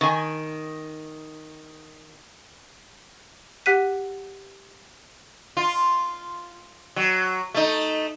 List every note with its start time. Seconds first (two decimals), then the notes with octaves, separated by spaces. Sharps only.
0.01 D#3 G#5
3.66 G4 F#5 F#6 B6 D#7
5.57 F4
6.96 F#3
7.54 A3 D#4